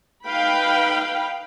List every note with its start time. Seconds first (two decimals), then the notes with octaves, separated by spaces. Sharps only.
0.25 D#4 B4 F5 G5 B5